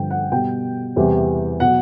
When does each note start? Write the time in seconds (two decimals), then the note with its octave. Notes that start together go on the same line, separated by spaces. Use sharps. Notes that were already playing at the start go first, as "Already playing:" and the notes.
Already playing: G2 D3 F3 G5
0.11 F#5
0.32 B2 G3 G5
0.96 E2 C3 E3 G3
1.60 B2 F#3 F#5